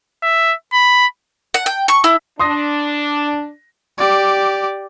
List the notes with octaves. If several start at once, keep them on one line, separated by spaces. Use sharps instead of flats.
E5
B5
F#5
G5
C#6
E4
D4 C6 D#6 A#6
G4 D5